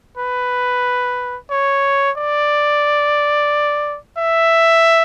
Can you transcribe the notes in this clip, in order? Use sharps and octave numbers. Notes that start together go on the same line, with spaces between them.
B4
C#5
D5
E5